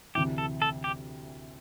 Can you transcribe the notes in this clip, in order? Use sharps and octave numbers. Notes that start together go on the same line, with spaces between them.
D2 C3 E3 G4
A4
A4
G4